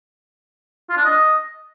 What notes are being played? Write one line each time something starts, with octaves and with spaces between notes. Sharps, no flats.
F4
D4
D#5